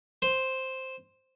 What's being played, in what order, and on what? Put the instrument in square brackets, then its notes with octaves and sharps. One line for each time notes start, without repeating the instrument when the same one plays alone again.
[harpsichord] C5